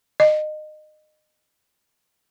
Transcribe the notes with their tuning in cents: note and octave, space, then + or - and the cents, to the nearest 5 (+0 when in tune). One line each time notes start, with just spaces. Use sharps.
D#5 -25